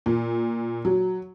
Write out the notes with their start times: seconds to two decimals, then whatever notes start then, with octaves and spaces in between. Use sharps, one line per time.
0.06 A#2
0.85 F#3